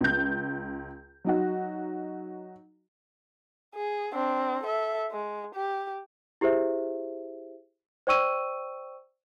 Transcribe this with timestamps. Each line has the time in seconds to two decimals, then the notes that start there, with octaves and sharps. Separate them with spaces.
0.01 C#2 G6
1.24 F#3 D#4 F#4
3.75 G#4
4.13 C4 D4
4.63 A4 E5
5.12 G#3
5.55 G4
6.41 E4 G4 G#4 C5 E5
8.07 C5 D5 G5 C#6 E6 D#7